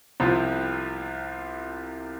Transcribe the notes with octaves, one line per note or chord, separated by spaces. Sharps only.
C2 C3 F3 C4 F4